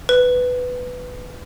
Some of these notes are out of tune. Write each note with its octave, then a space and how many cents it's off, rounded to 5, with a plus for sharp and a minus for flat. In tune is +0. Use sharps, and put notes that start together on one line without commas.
B4 +10